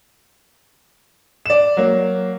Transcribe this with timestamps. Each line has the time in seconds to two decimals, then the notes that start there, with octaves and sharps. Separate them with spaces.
1.46 D5 E7
1.77 F#3 A#3